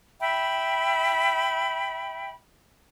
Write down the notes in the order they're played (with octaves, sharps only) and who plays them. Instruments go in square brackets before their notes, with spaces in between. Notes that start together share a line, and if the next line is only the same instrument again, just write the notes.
[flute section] E5 G5 B5